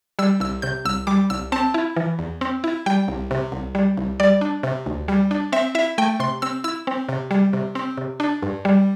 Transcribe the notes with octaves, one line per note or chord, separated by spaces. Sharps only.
G3 E6
C2 E6
C3 G6
C2 E6
G3 D6
C2 E6
C4 A5
E4
E3
E2
C4
E4
G3 G5
C2
C3
C2
G3
C2
G3 D5
D4
C3
D2
G3
D4
C4 E5
E4 E5
A3 G5
C3 C6
C4 E6
E4 E6
C4
C3
G3
C3
C4
C3
D4
G2
G3